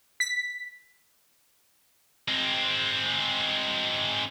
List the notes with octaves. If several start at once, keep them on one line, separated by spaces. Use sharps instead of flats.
B6
G#3 C4